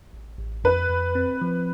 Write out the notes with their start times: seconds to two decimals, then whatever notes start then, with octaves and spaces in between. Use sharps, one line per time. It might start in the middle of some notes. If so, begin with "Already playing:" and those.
0.13 A1
0.38 A1
0.64 F2 B4
0.89 F2
1.15 C4
1.42 F3